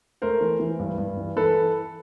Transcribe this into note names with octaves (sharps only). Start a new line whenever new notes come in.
A3 A#4 C5
E3
E3
G2
G2
E3
E3 A4 B4